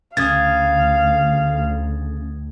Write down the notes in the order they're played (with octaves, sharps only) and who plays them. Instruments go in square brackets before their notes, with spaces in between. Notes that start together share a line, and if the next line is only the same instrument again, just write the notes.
[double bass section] D2 [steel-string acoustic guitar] C#3 [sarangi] F5 [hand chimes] D#6 G#6 A6